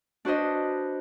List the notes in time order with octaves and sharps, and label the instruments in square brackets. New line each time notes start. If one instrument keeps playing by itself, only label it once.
[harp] D4 F#4 B4 C5 D#5